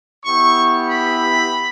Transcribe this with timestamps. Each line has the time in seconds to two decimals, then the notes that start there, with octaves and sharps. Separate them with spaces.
0.25 B3 E4 G4 C#6
0.88 B5